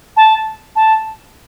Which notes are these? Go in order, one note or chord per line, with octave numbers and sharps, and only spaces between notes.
A5
A5